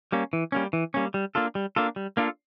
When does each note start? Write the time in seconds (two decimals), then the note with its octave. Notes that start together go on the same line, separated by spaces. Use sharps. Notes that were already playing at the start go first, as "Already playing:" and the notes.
0.12 G3 A#3 C#4
0.33 E3
0.52 G3 A#3 C#4
0.73 E3
0.94 G3 A#3 C#4
1.14 G3
1.35 A#3 D4 F4 A4
1.55 G3
1.76 A#3 D4 F4 A4
1.96 G3
2.17 A#3 D4 F4 A4